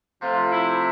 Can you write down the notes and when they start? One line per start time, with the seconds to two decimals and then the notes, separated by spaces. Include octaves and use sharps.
0.21 C3 F3 A3 C4 F4
0.50 E4